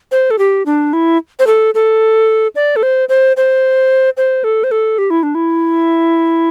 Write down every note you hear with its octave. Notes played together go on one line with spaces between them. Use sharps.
C5
A4
G4
D4
E4
C5
A4
A4
D5
A4
C5
C5
C5
C5
A4
C5
A4
G4
E4
D4
E4